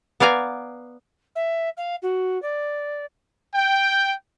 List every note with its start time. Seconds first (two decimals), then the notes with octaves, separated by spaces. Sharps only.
0.20 B3 D5 F5 G#5 A#5
1.35 E5
1.77 F5
2.02 F#4
2.42 D5
3.54 G5